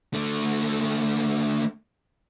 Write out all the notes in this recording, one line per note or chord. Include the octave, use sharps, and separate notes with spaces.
D3 A3